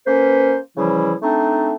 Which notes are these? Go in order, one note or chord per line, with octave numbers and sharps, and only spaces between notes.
A#3 C#4 B4 C5
C#3 E3 F3 G3 E4
A3 C4 D4 D#4